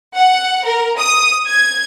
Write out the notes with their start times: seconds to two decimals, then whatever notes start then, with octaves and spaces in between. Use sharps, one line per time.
0.15 F#5
0.64 A#4
0.98 D#6
1.47 G#6